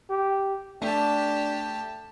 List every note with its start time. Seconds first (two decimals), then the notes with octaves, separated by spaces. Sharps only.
0.10 G4
0.82 A3 D4 G4 A5